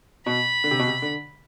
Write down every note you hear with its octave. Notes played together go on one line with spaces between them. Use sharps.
B2 B5
D3
C3
B2
C3
D3